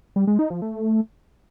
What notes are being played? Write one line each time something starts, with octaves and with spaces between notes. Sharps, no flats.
G3
G#3
D#4
F3
A3